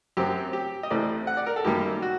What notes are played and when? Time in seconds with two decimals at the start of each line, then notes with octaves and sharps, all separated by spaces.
0.17 F#2 F#3 C4 G4
0.53 G4
0.83 D#5
0.90 A1 A2 A3 C4 D5
1.27 F#5
1.37 D5
1.46 A#4
1.56 A4
1.64 F#2 D#3 G3 A#3 G4
2.02 F#4